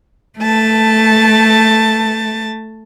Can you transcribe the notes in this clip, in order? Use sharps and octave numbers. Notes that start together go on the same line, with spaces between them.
A3 A5